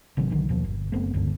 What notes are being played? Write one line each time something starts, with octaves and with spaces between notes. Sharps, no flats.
G1 C3 D#3 F#3
B1 D3 D#3 F#3
D#2 B2 F3
G1
F#1 A3 B3 C4
E1 C#2 G2 D3